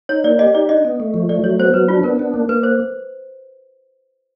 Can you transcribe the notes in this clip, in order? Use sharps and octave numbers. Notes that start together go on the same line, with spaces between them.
D#4 C#5
A#3 D5
G4 D#5
D#4 D5
D4 D#5
B3
A3
F3
A3 D5
F#3 C#5
B3 C5
F#3 B4
D4 F4
B3 A#4
D4
A#3
A#3 B4
C5